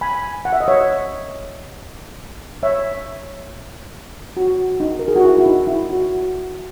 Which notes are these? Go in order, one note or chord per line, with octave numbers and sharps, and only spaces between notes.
G#5 B5
F#5
E5
D#5
C#5 E5
C#5 E5
F#4
D#4
A#4
G#4
F#4
E4
E4
D#4
E4
F#4